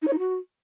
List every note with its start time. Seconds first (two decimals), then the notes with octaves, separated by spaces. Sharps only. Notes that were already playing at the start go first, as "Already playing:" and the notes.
0.02 D#4
0.07 C#5
0.13 D#4
0.18 F#4